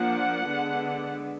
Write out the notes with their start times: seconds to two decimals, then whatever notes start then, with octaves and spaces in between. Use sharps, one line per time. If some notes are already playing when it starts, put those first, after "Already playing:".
Already playing: F3 A#3 D4 F#5
0.48 D3 G#3 B3 D4